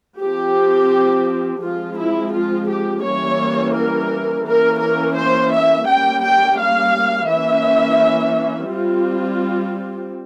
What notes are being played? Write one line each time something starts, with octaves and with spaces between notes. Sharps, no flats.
F3 C4 G4
F3 G#3 C4 F4
E4
F4
G4
E3 G3 A#3 C#4 C#5
A#4
E3 A#3 C#4 A#4
A#4
C5
E5
G3 A#3 C#4 G5
G5
F5
E3 A#3 C#4 E5
G3 C4 F4